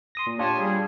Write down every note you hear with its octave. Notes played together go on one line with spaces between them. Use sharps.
C6 D#6 A#6
A#2
D4 F4 G4 C#5 G#5 A5
G3 G#4